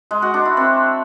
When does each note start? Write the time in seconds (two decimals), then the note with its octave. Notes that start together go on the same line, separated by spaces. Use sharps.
0.11 G#3
0.22 F#4
0.34 D4
0.45 E4
0.57 C4